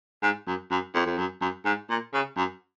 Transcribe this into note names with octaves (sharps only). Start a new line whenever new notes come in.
G#2
F#2
F#2
F2
F2
F#2
F#2
G#2
A#2
C#3
F#2